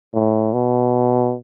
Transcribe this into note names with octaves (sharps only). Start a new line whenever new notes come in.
A2
B2